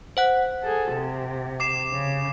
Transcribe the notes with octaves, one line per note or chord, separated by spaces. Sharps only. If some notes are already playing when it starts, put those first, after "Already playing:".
C5 F#5 F#6
G#4 A4
C3
D6 C7 E7
C#3